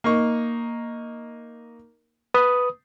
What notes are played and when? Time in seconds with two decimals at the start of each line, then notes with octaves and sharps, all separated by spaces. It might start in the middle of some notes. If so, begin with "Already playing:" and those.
0.04 A#3 D#4 C#6
2.34 B4 D#6